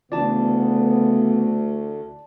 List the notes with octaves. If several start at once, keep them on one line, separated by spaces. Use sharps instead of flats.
D2 C#3 E3 B3 D4 D5 A5